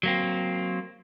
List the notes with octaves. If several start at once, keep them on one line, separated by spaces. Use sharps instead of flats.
F#3 A#3 C4